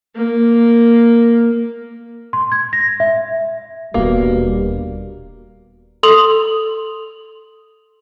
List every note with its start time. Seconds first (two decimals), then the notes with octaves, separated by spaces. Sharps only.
0.16 A#3
2.33 C6
2.52 G#6
2.73 A#6
3.00 E5
3.94 D#1 B2 G3 A#3 D4
6.03 A4 C6 D#6 F7 F#7